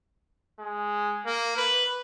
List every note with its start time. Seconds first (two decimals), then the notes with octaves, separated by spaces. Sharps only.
0.59 G#3
1.26 A#3
1.57 B4